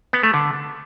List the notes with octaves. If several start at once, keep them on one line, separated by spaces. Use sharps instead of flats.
B3
A3
D3